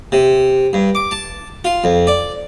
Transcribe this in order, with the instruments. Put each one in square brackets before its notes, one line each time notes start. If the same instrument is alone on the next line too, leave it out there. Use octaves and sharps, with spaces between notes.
[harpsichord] C3
G2
D6
A5
F4
F2
D5